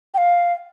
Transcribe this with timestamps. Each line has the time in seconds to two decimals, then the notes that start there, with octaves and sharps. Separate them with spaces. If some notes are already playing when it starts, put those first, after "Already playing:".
0.14 G5
0.18 F5